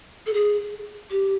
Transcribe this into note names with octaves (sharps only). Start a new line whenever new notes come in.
A4
G#4
G4